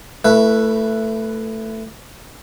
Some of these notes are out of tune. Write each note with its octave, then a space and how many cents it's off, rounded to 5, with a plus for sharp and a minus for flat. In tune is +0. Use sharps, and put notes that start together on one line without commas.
A3 +10 E4 +15 B4 -5